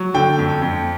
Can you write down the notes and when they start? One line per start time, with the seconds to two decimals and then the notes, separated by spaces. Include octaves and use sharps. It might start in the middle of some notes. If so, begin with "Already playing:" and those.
Already playing: F#3
0.14 D3 G5
0.39 F2
0.62 F2